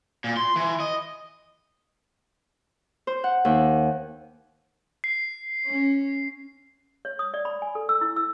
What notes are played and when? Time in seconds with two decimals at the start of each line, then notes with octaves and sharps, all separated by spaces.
0.24 A#2
0.37 C6
0.56 E3
0.80 D#5
3.07 C5
3.24 F#5
3.45 D#2
5.04 C7
5.66 C#4
7.05 C#5
7.19 D#6
7.34 D5
7.45 B5
7.62 G#5
7.75 A4
7.89 E6
8.01 E4
8.16 E6